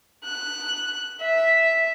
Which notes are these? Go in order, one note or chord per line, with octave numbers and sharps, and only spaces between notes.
F#6
E5